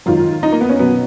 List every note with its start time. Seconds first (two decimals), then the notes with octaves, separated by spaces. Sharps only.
0.06 G#2 D#3 F#3 F4
0.43 D#4
0.52 A#3
0.61 B3
0.69 C#4
0.79 B2 F#3 B3